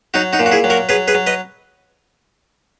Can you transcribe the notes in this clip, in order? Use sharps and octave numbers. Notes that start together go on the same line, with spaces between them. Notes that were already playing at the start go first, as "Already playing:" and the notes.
F#3 D#4 F#4
D#4 F#4
A#2
F#4
E4 G#4
F#3
F#4 A#4
F#3 G#4 B4
G#4 B4
F#3
B4 D#5